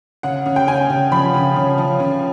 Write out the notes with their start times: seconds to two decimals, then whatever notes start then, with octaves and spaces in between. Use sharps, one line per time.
0.23 C#3 F#5
0.46 C#3
0.56 G5
0.67 C#3 G#5
0.90 C#3
1.12 F3 B5
1.34 C#3
1.56 C#3
1.78 F3
2.00 C#3